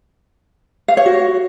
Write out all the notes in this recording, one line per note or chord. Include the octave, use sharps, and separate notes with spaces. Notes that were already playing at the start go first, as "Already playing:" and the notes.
F5
C#5
F#4